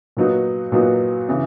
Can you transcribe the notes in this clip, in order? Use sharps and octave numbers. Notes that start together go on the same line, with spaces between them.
A#2 F#3 B3 D#4 F#4
A#2 F#3 B3 D#4 F#4
C#3 E3 B3